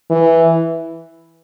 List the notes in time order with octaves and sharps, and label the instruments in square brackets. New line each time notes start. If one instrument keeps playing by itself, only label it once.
[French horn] E3